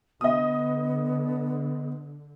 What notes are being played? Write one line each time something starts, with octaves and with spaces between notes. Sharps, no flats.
D3 B3 D#5 D#6